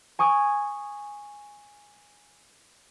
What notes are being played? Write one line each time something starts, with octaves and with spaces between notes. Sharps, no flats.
G#5 C#6 D#6 G#6 D7